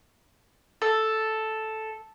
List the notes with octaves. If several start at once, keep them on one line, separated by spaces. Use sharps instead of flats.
A4